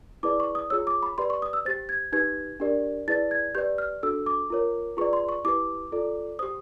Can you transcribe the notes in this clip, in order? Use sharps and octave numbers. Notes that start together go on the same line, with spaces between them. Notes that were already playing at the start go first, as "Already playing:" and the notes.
E4 G#4 B4 D5 D6
C#6
D#6
F4 G#4 C#5 E6
D6
B5
G4 B4 D5 C6
C#6
D#6
E6
G4 C5 A6
G#6
D#4 G4 B4 G#6
D4 G4 A#4 D5
E4 G#4 B4 D5 A6
G#6
G4 B4 D5 G6
F6
D4 F#4 A4 E6
D6
F4 A#4 C#5
F4 G#4 B4 D5 C#6
C6
C#6
E4 G4 B4 D6
F4 A4 D5
G4 C5 D#6